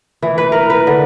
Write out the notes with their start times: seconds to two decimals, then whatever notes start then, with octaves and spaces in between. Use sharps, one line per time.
0.22 E3
0.38 B4
0.52 A#4
0.70 B4
0.87 D3